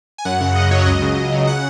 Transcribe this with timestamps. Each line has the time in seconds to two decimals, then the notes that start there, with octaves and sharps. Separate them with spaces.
0.18 G#5
0.25 F#2 F#5
0.41 C#3
0.55 F#2 D#5
0.71 F#3 C#5
0.86 C#2 D#5
1.02 C#3
1.17 C#2
1.32 C#3
1.47 F#5